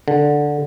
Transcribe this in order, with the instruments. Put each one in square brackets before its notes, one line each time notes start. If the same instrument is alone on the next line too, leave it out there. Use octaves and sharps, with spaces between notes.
[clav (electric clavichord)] D3